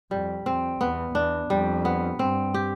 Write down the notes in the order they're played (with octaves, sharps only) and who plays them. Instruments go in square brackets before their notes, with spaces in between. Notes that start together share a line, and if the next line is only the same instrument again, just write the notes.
[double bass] F2 [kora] G3
[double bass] F2 [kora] C4
[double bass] E2 [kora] B3
[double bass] E2 [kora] D4
[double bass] F2 [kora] G3
[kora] B3
[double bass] G2 [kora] C4
[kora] G4